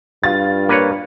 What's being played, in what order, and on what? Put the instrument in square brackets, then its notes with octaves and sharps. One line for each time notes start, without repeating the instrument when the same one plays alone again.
[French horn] G2 [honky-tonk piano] F4 A6
[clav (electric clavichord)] A#3 B4 C#5